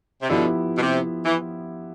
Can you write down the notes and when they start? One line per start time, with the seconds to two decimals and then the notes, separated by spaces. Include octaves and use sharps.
0.22 C3
0.29 B2 D3 F3 B3 E4 G4
0.77 B2
0.82 C3
1.25 E3